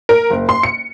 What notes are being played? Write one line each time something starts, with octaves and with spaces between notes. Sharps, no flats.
A#4
F#1
C6
C#7